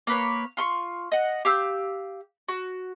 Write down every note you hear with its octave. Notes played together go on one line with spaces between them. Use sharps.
A#3 B4 C#5
F4 C6 C#6
D#5 F#5
G4 F5 E6 G6
F#4